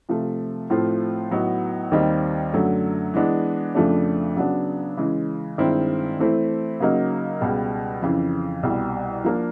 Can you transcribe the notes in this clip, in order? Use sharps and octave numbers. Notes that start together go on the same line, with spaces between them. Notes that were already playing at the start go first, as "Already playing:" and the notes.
C3 F3 A3
A2 F3 A3 C4 F4
A2 F#3 B3 D#4 F#4
D#2 D#3 G3 C4 D#4
F#2 D3 F#3 A3
E3 G#3 B3 D4
F2 C#3 F3 A3 D4
C#3 F#3 B3 D4
C#3 E3 G#3
G2 D#3 G#3 C4 E4
E3 A3 C4 E4
C#3 F#3 A#3 D#4
C#2 B2 G3
F2 C#3 E3
C2 B2 G3
F3 A#3 D4